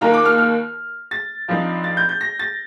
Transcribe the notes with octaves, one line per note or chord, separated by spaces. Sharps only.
D#2 D#3 A#3 F4 A#5
D6
F6
F6
A6
G2 F3 C4 D#4
A6
G6
G6
A#6
A6